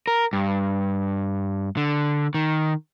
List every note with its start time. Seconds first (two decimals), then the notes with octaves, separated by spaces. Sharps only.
0.07 A#4
0.33 G2
1.77 D3
2.34 D#3